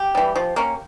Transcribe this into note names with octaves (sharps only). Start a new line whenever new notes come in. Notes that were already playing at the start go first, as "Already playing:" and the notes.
Already playing: G4
E3 G3
F3
A#3 C#4